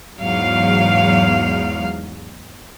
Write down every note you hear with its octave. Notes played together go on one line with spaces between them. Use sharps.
E2 G#2 F#3 F5